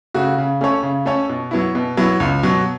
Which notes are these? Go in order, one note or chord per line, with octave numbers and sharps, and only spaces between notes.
C#3 A3 F#4
C#3
A3 C#4 A4 C#5
C#3
A3 C#4 A4 C#5
B2
F#3 B3 E4
B2
F#3 B3 E4
C#2
B2 F#3